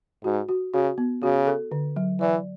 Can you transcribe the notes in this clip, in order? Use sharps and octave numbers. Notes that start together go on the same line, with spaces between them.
G#2 F#4
F#4
C#3 F#4
B3
C#3 F#4
A4
D3
F#3
E3 D5